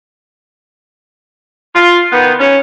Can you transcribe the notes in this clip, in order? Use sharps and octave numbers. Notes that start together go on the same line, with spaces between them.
F4
D#3 B3
C#4